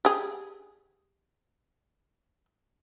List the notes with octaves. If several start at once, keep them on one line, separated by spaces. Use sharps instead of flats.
G4 G#4